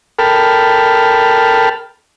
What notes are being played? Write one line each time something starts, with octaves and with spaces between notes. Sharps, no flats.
A4 A#4 G5 A5 B5 F6